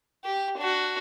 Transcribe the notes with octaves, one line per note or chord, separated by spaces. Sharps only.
G4
D4 F#4